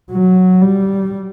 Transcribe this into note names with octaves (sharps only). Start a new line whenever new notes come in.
F#3
G3